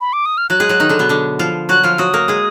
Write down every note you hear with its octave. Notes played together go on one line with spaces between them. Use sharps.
B5
D6
D#6
F6
F#3 F#4 F#6
G#3 G#4
F#3 F#4
D#3 D#4
D3 D4
B2 B3
D3 D4
F3 F4
F#3 F#4 F#6
F3 F4 F6
F#3 F#4 D#6
A#3 A#4
G#3 G#4